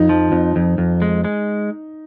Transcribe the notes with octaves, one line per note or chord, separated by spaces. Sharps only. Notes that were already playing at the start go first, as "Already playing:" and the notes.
Already playing: F2 D#4
F3
F2
F2
F2
G#3
G#3